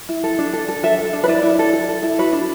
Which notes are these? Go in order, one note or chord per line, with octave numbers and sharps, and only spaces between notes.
E4
A4
D4
A4
A4
A4 E5
A4
D4
B4
E4 D5
E4
A4
A4
A4
E4
F#4 B4
D4